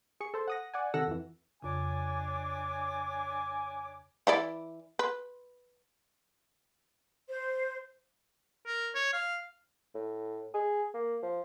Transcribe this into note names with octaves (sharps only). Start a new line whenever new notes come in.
G#4 C#6
A4 C5
F#5 D#6 A#6
D5 F#5 G#5
C3 D#3 A4 F#5 E6 A#6
F2 E3
F2 C#3 D4 C#5 G#5 D6
E3 E4 D5
B4
C5
A#4
C#5
F5
A2
G#4
A#3
F3